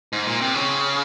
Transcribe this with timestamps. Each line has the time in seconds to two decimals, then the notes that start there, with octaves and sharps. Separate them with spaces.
0.13 G#2
0.26 A#2
0.41 C3
0.54 C#3